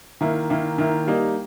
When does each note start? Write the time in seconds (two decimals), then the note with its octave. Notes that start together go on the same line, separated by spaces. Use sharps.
0.21 D#3 A#3 E4
0.50 D#3 A#3 E4
0.78 D#3 A#3 E4
1.07 G3 A#3 D#4